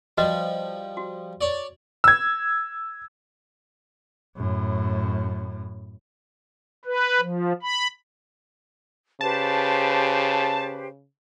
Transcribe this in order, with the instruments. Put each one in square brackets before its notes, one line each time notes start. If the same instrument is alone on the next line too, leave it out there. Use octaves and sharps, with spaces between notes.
[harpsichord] F3 G3 [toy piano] F#4 B4 D#5
[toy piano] F#4
[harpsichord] C#5 D5
[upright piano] E6 G#6
[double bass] F#2 A2
[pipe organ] B4
F3
B5
[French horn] C#3 [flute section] G4 B4 C5 [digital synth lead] A5